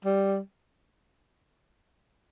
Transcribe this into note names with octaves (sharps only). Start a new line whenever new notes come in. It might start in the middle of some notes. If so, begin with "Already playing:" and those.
G3